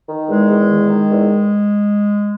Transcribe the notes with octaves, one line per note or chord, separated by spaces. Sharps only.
D#3
E2 G#3
E2
D#3
D#3
E2